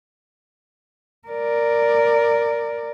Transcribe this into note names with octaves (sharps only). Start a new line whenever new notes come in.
A#4 D5